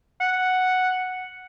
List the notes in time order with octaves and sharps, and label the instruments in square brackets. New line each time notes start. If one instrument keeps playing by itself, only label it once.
[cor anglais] F#5